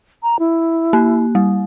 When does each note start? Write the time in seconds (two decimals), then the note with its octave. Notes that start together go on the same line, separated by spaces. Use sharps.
0.23 A#5
0.39 E4
0.93 A#3
1.35 G3